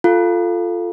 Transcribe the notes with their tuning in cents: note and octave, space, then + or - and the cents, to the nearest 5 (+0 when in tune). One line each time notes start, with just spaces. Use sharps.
F4 +0 A4 +0